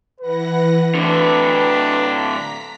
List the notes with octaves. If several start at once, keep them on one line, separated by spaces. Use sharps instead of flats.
E3 B4 F#5 A#6
A2 D3 D4 A#5 B6